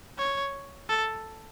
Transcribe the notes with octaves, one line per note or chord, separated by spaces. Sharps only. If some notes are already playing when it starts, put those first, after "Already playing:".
C#5
A4